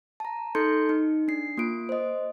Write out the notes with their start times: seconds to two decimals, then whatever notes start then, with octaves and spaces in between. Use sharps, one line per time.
0.20 A5 A#5
0.55 D#4 A4 C6 G6 C#7
0.89 D#4
1.28 D4 C7
1.57 A#3 F4 D7
1.89 C5 D#5